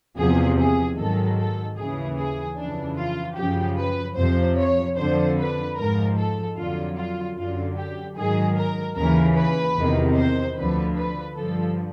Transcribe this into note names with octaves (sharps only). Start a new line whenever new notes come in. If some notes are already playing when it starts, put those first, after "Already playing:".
E2 C3 F3 G#4
G#4
G#2 D#3 F#3 A4
A4
D#2 C#3 E3 G#4
G#4
F2 C#3 E3 D4
F4
F#2 C#3 F3 G4
B4
F2 C3 F3 C5
C#5
F2 D3 F3 C5
B4
G#2 F3 A#4
A4
F2 D3 F#3 F4
F4
F#2 D3 F#3 F4
G4
G#2 D#3 F#3 G#4
A#4
D#2 C#3 E3 A#4
B4
E2 C3 D#3
C5
D2 D3 F3 B4
B4
G2 D3 F3 A4